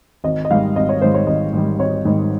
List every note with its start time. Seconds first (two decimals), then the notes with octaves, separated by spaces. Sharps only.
0.24 G#1 D#5
0.45 D#5
0.51 G#2 D#3 G3 F5
0.76 G#1 D#5
0.89 C#5
1.01 G#2 D#3 G3 C5
1.14 C#5
1.27 G#1 D#5
1.53 G#2 D#3 G3
1.79 G#1 C#5
2.05 G#2 D#3 G3